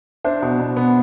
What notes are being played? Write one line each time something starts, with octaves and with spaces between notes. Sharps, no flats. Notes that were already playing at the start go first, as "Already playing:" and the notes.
D4 C5 E5
B2
B2
B3